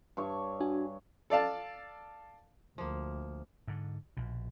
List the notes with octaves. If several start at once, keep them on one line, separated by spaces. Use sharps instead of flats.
G2 C#5 C#6
D4 F#4 G#5
A4 D5 F5 A5
D2 F3 A#3
G#2 D3
A#1 B2